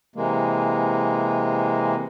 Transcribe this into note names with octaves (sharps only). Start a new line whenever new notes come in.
C3 E3 G#3 A#3